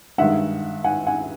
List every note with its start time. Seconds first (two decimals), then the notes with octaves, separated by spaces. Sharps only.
0.18 G2 D#3 G#3 E5 F#5
0.84 F#5 G#5
1.06 F#5 G#5